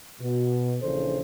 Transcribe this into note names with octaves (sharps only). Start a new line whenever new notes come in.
B2
A#1 C#3 E3 D4 A4 C5